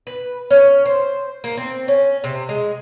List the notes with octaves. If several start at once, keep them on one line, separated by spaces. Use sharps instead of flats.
B4
C#4
C5
A#3
C4
C#4
C3
G#3